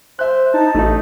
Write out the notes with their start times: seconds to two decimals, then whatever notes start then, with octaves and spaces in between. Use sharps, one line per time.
0.19 C5 E5 F#6
0.54 D#4 A5
0.75 A1 A3 D#4